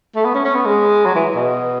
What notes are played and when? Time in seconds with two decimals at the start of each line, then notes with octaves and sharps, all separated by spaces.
0.16 A3
0.25 B3
0.35 C#4
0.45 C#4
0.55 B3
0.66 G#3
1.06 F#3
1.15 E3
1.36 B2